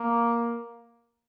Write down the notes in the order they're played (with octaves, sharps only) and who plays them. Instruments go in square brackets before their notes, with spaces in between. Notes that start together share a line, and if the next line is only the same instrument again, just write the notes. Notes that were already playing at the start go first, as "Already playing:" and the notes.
Already playing: [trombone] A#3